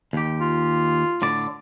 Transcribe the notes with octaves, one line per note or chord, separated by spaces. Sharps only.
D#2 G4
F4
A2 D3 D5